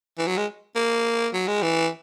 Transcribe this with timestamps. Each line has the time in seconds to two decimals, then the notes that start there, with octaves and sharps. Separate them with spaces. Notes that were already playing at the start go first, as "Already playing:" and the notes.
0.18 E3
0.27 F#3
0.37 G#3
0.76 A#3
1.34 F#3
1.47 G#3
1.62 E3